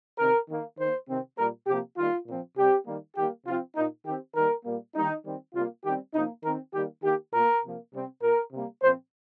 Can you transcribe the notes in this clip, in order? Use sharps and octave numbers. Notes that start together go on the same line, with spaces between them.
C3 D#3 C4 A#4
D#3 A#3
D#3 A#3 C5
C3 D#3 C4
A#2 G3 A#3 A#4
C3 F3 A#3 G4
D#3 G3 A#3 F4
A#2 F3 C4
C3 G3 C4 G4
D#3 G3 A#3
D#3 G3 A#3 G4
C3 F3 C4 F4
A#2 A#3 D#4
D#3 C4 G4
D#3 G3 A#3 A#4
A#2 G3 A#3
D#3 G3 A#3 D#4
D#3 G3 C4
C3 G3 A#3 F4
D#3 G3 C4 G4
C3 F3 A#3 D#4
D#3 C4 A#4
D#3 G3 A#3 G4
D#3 A#3 G4
A#2 A#3 A#4
C3 F3 A#3
C3 G3 C4
A#2 A#3 A#4
C3 G3 A#3
A#2 F3 C4 C5